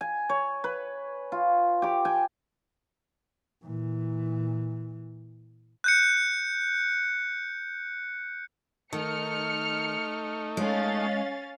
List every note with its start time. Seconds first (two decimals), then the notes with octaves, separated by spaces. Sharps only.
0.01 G#5
0.29 C#5
0.64 B4
1.32 F4
1.82 G4 D6
2.05 G5 G#5
3.62 A#2 E3
5.84 F#6 G6 C#7
8.93 D#3 A3 D#4 F6 C#7
10.57 G#3 C#4 F5 A6